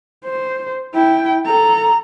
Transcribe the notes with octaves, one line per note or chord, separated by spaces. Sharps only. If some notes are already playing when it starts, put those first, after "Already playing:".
C5
E4 G5
A4 A#5